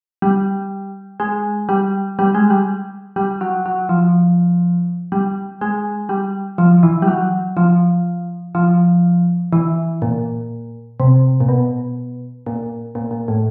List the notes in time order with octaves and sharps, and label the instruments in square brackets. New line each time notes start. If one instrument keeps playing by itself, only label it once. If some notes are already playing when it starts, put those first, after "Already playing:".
[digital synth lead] G3
G#3
G3
G3
G#3
G3
G3
F#3
F#3
F3
G3
G#3
G3
F3
E3
G3
F#3
F3
F3
E3
A#2
C3
A#2
B2
A#2
A#2
A#2
A2